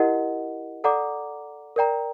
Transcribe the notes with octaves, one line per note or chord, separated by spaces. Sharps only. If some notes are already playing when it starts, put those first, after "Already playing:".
Already playing: E4 G4 A#4 D#5 F#5
A4 D5 F#5 A#5 D6
A#4 D5 G5 A#5